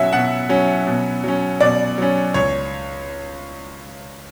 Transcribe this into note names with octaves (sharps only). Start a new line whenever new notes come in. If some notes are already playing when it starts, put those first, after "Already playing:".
Already playing: B2 F#3 C#4 E5 F#5
B2 F#5
F#3 C#4
B2
F#3 C#4
B2 D5
F#3 C#4
C#2 C#5